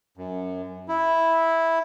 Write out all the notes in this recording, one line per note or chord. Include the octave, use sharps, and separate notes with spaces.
F#2
E4